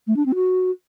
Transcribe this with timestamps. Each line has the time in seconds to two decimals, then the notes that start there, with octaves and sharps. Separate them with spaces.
0.07 A3
0.16 D4
0.26 C4
0.35 F#4